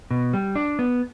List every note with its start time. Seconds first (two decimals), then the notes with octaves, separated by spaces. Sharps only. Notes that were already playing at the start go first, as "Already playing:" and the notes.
0.11 B2
0.33 G3
0.56 D4
0.79 B3